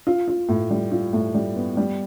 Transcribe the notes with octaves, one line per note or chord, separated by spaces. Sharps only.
F4
F4
A2
G3
F4
A2
G3
B3
G3